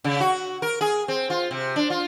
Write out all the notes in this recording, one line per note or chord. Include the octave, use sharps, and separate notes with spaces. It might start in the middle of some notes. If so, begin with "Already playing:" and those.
C#3
F#4
A#4
G#4
C4
F4
C3
D4
F4